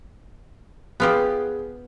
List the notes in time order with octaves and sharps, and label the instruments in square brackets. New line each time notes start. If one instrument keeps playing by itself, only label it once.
[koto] B3 F4 G4 [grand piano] G#4